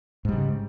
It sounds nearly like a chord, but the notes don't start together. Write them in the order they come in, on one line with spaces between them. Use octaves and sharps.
G#2 G3 C#3